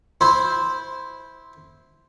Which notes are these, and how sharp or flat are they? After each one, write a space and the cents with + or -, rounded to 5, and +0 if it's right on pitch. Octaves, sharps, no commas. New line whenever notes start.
E4 -10 C5 +0